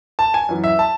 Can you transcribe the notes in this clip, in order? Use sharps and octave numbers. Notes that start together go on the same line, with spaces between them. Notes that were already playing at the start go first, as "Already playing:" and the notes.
A5
G#5
F#2 E3
E5
A5